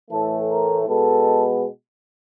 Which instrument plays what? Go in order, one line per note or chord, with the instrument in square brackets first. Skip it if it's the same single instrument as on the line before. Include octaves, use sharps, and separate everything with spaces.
[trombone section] A2 E3 A3 A4
A#4
B2 G#3 B3 A4